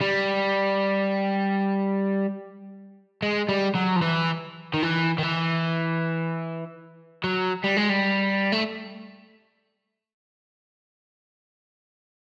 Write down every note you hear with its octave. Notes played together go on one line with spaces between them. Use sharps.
G3
G#3
G3
F#3
F3
E3
D#3
E3
D#3
E3
F#3
G3
G#3
G3
A3